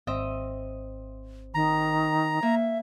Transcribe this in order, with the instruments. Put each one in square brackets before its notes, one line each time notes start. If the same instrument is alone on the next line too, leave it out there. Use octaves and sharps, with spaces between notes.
[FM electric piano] G#1 [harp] C4 D#5 E5
[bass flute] D#3 [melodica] A#5
[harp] A#3 [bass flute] E5